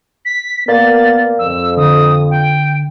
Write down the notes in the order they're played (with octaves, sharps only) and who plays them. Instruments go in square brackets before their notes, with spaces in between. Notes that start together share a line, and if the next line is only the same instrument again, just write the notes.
[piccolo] B6
[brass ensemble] A#3 B3 [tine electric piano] A#4 D5 F5 [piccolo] A6
[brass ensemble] F2 [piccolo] E6
[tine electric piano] D3 [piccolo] D#6
[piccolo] G5